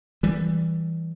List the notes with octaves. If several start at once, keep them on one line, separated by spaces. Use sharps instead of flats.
E3 G3